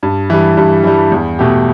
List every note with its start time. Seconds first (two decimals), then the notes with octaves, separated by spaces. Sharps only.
0.03 G2
0.30 E3 G3
0.57 G2
0.83 E3 G3
1.11 E2
1.39 B2 A3 G4